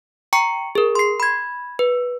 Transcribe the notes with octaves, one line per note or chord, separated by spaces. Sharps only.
G5 A#5 C#6 C#7
G#4 A#4
C6 C7
B5 G#6
B4